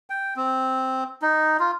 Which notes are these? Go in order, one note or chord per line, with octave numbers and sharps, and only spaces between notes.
G5
C4
D#4
F4